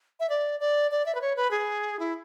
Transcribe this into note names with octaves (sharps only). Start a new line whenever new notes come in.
E5
D5
D5
D5
E5
B4
C#5
B4
G#4
E4